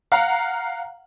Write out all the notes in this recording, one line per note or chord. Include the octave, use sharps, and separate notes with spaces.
F5 F#5 A#5